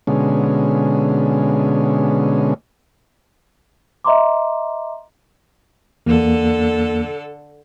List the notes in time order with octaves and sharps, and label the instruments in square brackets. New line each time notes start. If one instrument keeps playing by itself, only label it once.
[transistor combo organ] B2 D3 G#3 C#4
[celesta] D#5 E5 A#5 C6 D6
[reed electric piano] E2 A#3 [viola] D3 A4